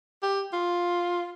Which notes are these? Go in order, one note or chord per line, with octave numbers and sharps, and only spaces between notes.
G4
F4